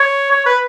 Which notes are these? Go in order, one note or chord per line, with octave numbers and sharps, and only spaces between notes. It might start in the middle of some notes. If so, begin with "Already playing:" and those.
Already playing: C#5
C#5
B4